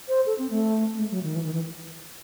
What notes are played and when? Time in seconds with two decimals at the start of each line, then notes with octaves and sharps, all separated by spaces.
0.08 C5
0.26 A4
0.39 C4
0.50 A3
0.95 A3
0.99 G#3
1.11 F#3
1.23 D#3
1.35 E3
1.44 D#3
1.53 E3